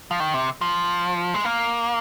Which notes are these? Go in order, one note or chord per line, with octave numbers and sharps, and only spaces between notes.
F3
D#3
C3
F3
G#3
A#3